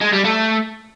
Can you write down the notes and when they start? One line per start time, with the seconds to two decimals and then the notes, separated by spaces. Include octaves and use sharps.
0.01 G#3
0.13 G3
0.25 A3